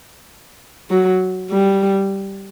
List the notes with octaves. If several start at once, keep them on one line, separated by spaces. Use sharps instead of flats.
F#3
G3